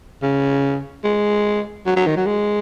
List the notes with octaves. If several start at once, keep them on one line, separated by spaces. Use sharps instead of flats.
C#3
G#3
F#3
F#3
D#3
F#3
G#3